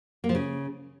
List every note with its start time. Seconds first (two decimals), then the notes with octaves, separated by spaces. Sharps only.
0.24 A#3
0.29 F3
0.35 C#3